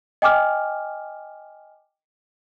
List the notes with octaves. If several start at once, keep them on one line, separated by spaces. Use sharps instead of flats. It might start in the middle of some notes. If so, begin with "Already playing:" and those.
D#5 G5 G#5 D6 F6